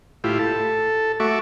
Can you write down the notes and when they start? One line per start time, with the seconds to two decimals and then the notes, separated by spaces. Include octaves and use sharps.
0.24 A2 E4 F4 G4
0.39 A4
1.20 A3 F#4 E5 C#6 D6